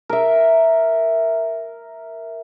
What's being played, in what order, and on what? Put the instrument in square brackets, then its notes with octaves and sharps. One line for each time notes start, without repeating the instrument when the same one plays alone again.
[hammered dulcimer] A#4 E5